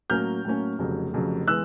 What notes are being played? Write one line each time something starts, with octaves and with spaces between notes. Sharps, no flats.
A2 F#3 A#3 C#4 F6 G6
A2 F#3 A#3 C#4
F1 F2 C#3 F#3
F1 F2 C#3 F#3
E3 G#3 B3 E6 F#6